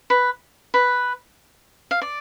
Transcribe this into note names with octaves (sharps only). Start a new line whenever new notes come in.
B4
B4
F5
D5